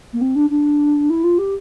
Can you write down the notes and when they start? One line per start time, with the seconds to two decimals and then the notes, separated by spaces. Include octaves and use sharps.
0.13 A#3
0.21 C4
0.35 D4
0.50 D4
1.10 E4
1.24 F4
1.38 G4